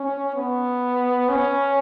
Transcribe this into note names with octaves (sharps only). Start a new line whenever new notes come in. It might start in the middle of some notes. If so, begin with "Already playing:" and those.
Already playing: C#4
B3
C#4